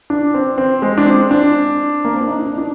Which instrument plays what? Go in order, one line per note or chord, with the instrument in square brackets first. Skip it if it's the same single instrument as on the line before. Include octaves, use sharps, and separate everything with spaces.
[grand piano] D4
C4
C4
G#3
D4
C4
D4
A#3
C4
D4
D#4
D4
D4